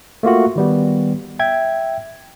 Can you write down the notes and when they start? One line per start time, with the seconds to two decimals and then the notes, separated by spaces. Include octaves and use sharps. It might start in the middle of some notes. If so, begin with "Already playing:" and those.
0.23 A3 A#3 F4 F#4
0.56 D#3 G3 B3
1.39 E5 G5 G#6